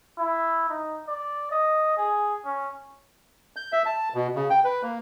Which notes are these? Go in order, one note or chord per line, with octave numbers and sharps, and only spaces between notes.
E4
D#4
D5
D#5
G#4
C#4
G6
E5
A5
B2
C#3
G5
B4
A#3